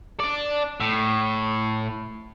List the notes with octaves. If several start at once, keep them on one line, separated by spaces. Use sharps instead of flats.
D4 D5
A2